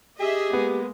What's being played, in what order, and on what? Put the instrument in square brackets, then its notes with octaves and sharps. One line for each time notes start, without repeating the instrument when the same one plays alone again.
[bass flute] G4 [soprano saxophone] G#4 [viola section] D#5 E5
[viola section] G#3 A#3 [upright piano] B3